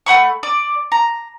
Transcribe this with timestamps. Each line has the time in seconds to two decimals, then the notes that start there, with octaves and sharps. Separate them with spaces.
0.06 A3 F#5 B5 C#6
0.43 D5
0.92 A#5